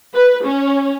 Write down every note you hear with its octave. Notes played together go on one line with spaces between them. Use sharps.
B4
C#4